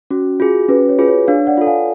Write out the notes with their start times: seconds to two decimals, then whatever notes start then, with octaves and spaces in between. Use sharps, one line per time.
0.11 C#4 F#4
0.40 F4 F#4 G#4
0.69 C#4 B4
0.89 C#5
0.99 F4 G#4 B4
1.08 C#5
1.27 D4 C#5 F5
1.47 D5 F#5
1.57 F4 A4
1.67 F5 G#5